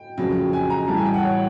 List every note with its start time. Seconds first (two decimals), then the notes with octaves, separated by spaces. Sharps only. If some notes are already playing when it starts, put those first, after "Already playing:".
Already playing: G5
0.18 F2 C#3 F#3
0.53 G#5
0.70 A#5
0.88 A2 E3 G3 A5
0.97 G#5
1.06 G5
1.14 F#5
1.24 C#5